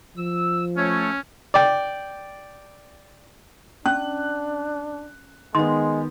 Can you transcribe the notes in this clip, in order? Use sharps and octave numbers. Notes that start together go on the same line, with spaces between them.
F3 E6
A3 C#4 C#5
D5 G5
C#4 D4 F#6
D#3 G#3 B3 C6